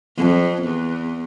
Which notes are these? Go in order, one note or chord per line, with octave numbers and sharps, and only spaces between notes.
F2
E2